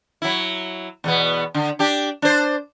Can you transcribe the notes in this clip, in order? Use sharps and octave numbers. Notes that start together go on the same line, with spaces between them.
F#3 E4
E2 B2 B3
D3
D4 G4
D4 C5